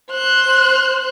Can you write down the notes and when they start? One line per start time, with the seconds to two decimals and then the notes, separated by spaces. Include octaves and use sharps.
0.11 C5 F#6